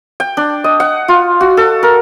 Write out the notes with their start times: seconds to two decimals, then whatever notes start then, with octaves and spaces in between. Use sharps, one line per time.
0.20 G5
0.37 D4
0.64 D#5
0.80 F#5
1.08 F4
1.41 F#4
1.57 A4
1.83 A#4